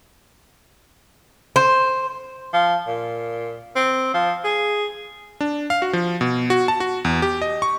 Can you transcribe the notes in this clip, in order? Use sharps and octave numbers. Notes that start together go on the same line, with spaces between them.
C5
F3
A#2
C4
F3
G#4
D4
F5
F#4
F3
B2
F#4
A5
F#4
E2
G4
D#5
C#6